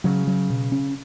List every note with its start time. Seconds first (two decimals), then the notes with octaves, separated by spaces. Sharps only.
0.04 C#3 F#3
0.27 F#3
0.50 B2
0.72 C#4